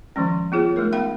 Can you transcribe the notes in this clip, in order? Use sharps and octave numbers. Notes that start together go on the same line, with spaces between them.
D#3 F3 G#3 C#4
B3 F4 G#4 C#5
G#3 A3 D#4 A#4
B3 E5 F5 B5